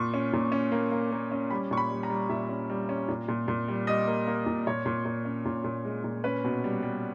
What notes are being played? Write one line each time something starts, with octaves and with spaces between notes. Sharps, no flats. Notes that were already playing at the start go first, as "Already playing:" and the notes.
Already playing: A#2 C#6
C#4
A#2
C#4
A#3
A#3
A#3
C#4
G3 B5
A#2 C#6
B5
G3
A#5
G3
A#2 E5
C#4
G3
C#4
A#2
A#2
A#2
G3
G3 D#5
A#3
A#3
A#2
A#2 C#5
A#2
A#2
C#4
A#2
A#2
G#3
A#2
C#4 B4
B2
G3
G3